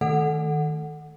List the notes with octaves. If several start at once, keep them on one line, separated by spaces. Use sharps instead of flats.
D#3 A3 A4 F#5